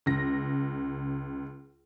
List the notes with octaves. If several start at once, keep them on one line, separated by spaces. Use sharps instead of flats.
C#2 A#6